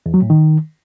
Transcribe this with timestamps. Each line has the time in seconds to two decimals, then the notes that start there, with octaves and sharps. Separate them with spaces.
0.06 E2
0.14 F#3
0.22 A2
0.30 D#3